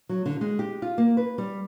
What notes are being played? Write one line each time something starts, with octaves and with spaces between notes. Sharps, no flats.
F#3
D3
G#3
G4
F4
A#3
B4
G3